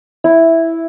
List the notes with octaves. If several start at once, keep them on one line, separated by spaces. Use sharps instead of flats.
E4